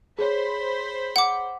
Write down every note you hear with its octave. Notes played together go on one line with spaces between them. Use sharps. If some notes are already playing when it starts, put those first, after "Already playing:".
G#4 C5 C#5 B5
F#5 D6